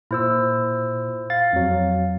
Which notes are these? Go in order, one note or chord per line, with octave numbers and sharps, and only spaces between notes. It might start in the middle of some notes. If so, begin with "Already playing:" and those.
A#2 E4 C5 E6
F5 A6
F2 F#3